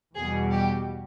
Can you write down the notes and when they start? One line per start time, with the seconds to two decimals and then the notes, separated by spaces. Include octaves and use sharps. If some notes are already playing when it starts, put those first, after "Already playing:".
0.15 E2 B2 G3 G#4
0.51 G4